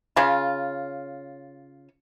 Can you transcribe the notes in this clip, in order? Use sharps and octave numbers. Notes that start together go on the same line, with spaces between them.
C#3 F4